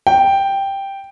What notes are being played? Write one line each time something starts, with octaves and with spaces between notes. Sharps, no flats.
G5